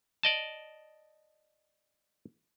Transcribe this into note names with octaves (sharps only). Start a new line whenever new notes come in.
D5 D#5 A5